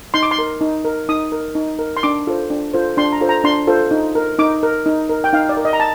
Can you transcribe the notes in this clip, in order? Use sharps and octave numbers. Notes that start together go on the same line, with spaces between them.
D#4 C6
D6
C6
A#4
D#4
A#4
D#4 D#6
A#4
D#4
A#4
C6
D4 D6
F4 A4 C5
D4
F4 A4 C5
D4 C6
A#5
F4 A4 C5
A#5
D4 C6
F4 A4 C5
D#4
A#4
D#4 D6
A#4
D#4
A#4
G5
D#4 F5
D5
A#4
D#5
A#5
A5